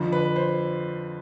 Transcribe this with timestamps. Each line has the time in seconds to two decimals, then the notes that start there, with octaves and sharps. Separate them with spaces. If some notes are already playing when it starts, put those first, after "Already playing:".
Already playing: F2 D3 F3
0.12 B4
0.36 C5